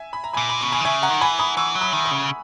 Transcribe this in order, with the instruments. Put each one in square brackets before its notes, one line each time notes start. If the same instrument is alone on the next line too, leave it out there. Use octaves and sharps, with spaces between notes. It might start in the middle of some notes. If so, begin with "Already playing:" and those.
Already playing: [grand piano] E5 G#5
B5
A#5
[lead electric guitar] A#2 [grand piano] G#5 B5
[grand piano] B5
[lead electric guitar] B2 [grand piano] C#6
[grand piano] G#5 B5
[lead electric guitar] D#3
[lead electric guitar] C#3 [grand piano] E5 G#5
[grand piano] F#5 A#5
[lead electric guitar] D#3
[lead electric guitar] E3 [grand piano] G#5 B5
[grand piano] B5 D#6
[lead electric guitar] E3 [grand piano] C#6 E6
[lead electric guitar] F#3
[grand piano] B5 D#6
[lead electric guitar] D#3
[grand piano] B5 D#6
[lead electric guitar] C#3